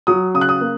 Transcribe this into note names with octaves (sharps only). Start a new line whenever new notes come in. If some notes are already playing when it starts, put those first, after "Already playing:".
F#3 D#6
C#3 D#6
F#6
D#6
A#3